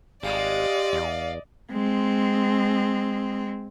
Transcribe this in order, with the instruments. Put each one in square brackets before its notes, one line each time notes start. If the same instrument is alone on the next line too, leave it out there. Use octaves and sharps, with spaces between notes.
[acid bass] G#1 [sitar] G3 G#3 [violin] D5 D#5 [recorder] F5
[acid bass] E2 [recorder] F5
[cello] G#3 C4